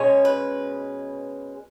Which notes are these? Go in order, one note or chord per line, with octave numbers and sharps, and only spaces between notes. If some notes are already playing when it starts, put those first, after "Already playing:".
Already playing: B2 G#3 C#4 C#5
B4